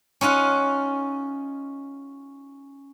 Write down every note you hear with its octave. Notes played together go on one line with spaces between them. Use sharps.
C#4 D#4 F4 F#5